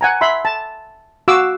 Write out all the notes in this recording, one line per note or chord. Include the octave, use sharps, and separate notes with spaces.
F#5 G#5 A#5
E5 B5 C6
A5
F#4 F5 D6 E6